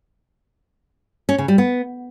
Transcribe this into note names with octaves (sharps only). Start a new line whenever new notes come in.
C#4
C#3
G3
B3